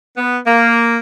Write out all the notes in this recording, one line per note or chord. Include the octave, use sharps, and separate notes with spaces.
B3
A#3